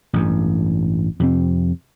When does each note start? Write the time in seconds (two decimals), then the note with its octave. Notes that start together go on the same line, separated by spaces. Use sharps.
0.13 A1 G2
1.20 F2 C3 C4